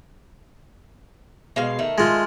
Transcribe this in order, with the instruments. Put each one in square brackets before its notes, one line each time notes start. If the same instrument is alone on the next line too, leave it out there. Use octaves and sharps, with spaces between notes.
[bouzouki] B2 G#3 F5
D#3 A3
[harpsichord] G#3 F4